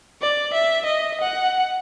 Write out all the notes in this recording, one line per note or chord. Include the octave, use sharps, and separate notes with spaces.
D5
E5
D#5
F#5